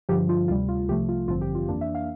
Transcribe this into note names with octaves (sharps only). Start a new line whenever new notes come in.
G2 D3 F3 G4
F4
D2 C3 G3 F4
F4
C2 C3 F3 A3 G4
F4
A1 G2 D3 F3 C4 F4
G4
F4
F2 E3 A#3 D4
E5
F5